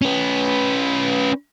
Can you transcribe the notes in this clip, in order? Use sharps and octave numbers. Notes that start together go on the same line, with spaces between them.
C#4 B4